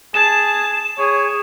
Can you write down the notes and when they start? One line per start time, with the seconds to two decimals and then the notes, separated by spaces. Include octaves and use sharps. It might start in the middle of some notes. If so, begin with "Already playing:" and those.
0.14 G#4 A5 E7
0.98 G#4 C#5